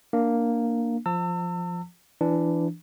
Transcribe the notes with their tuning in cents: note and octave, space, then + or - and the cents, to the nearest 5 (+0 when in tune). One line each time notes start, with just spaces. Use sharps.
A#3 +0 D4 +5
F3 +0 A5 +45 E6 +5
E3 +20 D4 +0